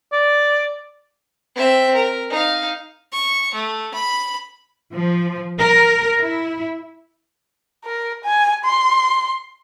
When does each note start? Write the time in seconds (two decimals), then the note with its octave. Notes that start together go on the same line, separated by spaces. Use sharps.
0.12 D5
1.56 C4 E5
1.95 A#4
2.30 D#4 F5
3.12 C#6
3.53 A3
3.94 B5
4.93 F3
5.59 A#4
6.21 E4
7.84 A#4
8.25 G#5
8.65 C6